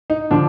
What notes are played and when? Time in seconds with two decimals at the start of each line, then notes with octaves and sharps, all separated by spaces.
0.10 D#4
0.31 D3 F3 D4